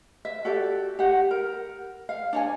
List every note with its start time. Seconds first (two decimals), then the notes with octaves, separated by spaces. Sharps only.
0.25 E5
0.45 F#4 G4 A4 D5
0.99 G4 F#5
1.31 A#4
2.09 F5
2.33 D4 C#5 G#5